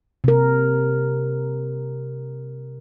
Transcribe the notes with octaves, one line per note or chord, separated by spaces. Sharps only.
C3 A#4